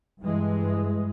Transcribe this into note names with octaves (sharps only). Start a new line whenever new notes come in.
G2 E3 G#3